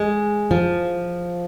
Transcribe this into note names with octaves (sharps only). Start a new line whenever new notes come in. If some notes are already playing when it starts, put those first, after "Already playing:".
Already playing: G#3
F3